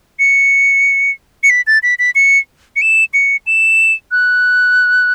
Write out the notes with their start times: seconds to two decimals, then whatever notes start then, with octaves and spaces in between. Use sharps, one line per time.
0.19 C#7
1.43 C#7
1.50 B6
1.67 A6
1.83 B6
1.99 B6
2.15 C#7
2.76 C#7
2.82 E7
3.14 C#7
3.47 E7
4.12 F#6